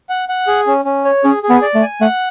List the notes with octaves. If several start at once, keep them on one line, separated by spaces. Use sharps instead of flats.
F#5
F#5
G#4
C#4
C#4
C#5
C#4 G#4
G#4
B3
D5
A3
G#5
A3 F#5